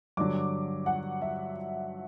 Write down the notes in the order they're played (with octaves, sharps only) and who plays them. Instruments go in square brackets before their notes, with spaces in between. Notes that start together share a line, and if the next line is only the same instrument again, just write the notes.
[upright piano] G2 D3 F#3 D6
F#5
E5